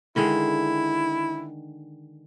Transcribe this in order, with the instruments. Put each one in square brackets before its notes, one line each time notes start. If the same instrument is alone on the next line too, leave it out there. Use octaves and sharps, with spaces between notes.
[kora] D3 D#3 G#3 [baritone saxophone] E4